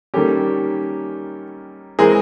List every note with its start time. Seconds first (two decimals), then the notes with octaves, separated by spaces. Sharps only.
0.14 D#3 G3 A#3 C#4 G4 A4
1.99 E3 G#3 C4 G#4 A#4